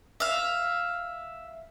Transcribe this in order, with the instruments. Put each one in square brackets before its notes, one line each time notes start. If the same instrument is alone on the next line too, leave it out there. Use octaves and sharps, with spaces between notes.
[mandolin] E5 F5